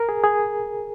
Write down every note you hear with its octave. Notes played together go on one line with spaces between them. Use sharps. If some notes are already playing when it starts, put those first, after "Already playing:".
Already playing: A#4
G#4
G#4